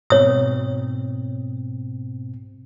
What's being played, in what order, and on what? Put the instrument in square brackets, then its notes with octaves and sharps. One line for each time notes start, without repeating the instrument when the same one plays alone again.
[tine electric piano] G#2 B2 C4 [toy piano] C#5 D#6